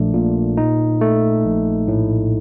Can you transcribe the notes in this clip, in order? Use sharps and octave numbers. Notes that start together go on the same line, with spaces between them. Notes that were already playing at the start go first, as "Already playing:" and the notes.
Already playing: A#1 A3 D4
A#2
D#4
A3
A#1
A2